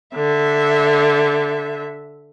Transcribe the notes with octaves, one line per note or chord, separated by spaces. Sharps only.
D3 E5